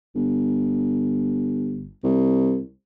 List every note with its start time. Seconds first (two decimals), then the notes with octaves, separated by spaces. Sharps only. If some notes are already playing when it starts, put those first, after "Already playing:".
0.15 G1
2.04 C2